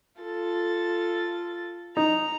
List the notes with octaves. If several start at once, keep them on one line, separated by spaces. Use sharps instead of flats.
F4 A4 A6
D#4 A#5